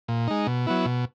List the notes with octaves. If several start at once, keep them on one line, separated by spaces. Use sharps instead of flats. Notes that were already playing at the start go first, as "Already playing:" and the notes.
A#2
G#3 D#4
B2
F#3 B3 E4
B2